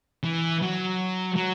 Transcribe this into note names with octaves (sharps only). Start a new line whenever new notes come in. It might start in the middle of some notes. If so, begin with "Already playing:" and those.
E3
F#3
F#3